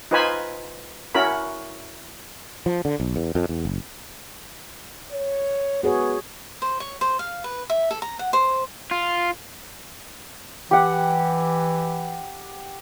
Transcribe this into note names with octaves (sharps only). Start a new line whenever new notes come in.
D#4 F4 B4 C5 G#5 B5
C#4 E4 F#4 A#4 B5
F3
D3
B1
E2
F2
E2
F#1
C#5
B3 F#4 G#4 C#5
C5
C#5
C5
F5
B4
E5
A4
A#5
F#5
C5
F4
E3 G4 F#5